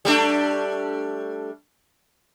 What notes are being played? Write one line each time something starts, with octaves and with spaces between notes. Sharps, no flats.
G3 A3 D4